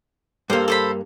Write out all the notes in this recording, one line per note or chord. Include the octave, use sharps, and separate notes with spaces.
G2 A#3 A4 C5
A4 C5 B5